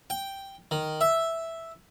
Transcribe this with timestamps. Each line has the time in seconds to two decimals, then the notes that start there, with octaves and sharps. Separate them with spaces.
0.10 G5
0.71 D#3
1.01 E5